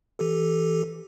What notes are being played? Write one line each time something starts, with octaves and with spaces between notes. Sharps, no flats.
E3 G4 A4